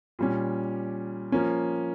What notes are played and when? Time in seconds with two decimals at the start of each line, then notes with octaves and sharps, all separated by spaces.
0.19 A#2 G3 C#4
1.32 F3 A#3 C#4